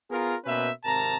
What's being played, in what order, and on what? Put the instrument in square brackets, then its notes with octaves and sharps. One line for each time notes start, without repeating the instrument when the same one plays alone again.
[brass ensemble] B3 F4 G#4 A#4
B2 A#3 C#4 B4 C5 E5
G#1 C3 A#4 A5 A#5